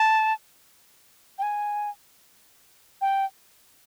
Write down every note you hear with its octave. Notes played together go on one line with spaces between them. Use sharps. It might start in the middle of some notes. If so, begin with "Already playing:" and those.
Already playing: A5
G5
G#5
G5